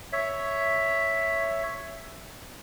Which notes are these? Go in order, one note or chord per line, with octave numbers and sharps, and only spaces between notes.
C#5 E5